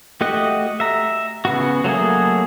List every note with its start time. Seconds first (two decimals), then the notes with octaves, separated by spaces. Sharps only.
0.21 A3 F#4 G4 D#5 F#5
0.80 E5 A#5
1.45 C#3 B3 F#4
1.84 F#3 A3 A#3 G#4